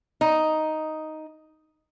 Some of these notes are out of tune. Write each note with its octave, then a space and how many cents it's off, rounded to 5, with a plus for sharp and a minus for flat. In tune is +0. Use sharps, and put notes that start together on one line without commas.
D#4 +5